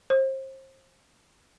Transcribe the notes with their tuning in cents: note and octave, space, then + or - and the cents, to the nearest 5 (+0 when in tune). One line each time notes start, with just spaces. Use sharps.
C5 +30